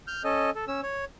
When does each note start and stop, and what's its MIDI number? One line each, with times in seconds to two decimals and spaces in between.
0.07 0.23 89
0.07 0.23 91
0.24 0.50 61
0.24 0.50 69
0.24 0.50 75
0.55 0.65 69
0.68 0.81 61
0.68 0.81 88
0.83 1.05 73